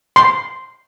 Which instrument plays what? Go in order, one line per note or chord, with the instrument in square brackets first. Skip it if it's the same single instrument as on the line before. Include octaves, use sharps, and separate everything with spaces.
[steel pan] C6